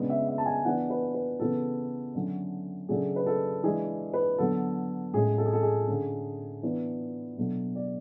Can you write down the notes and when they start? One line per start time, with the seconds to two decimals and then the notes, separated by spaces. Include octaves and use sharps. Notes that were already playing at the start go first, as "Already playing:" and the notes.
Already playing: C#3 G#3 B3 D4
0.09 E5
0.28 E5
0.38 A5
0.46 G#5
0.64 E3 B3 D4 F#5
0.90 B4
1.14 B4
1.39 C#3 E3 B3 A4
2.15 D3 F#3 A3 C#4
2.89 C#3 F#3 A3 D4 G#4
3.16 B4
3.26 A4
3.63 E3 G#3 D4 G#4
4.14 B4
4.38 D3 F#3 B3 A4
5.13 A2 G#3 C#4 G#4
5.38 A4
5.46 G#4
5.53 A4
5.63 G#4
5.87 D3 A3 C#4
6.63 E3 B3 D4
7.37 B2 F#3 A3 D4
7.75 D5